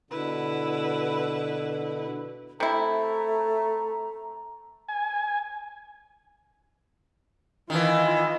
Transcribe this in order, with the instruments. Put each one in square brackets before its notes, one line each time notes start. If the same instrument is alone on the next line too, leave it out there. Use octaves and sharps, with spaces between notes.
[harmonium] B2 D3 [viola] E4 B4
[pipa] C3 E4 [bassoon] A3 [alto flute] A#5
[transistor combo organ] G#5
[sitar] D#3 E3 [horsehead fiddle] F4 D#5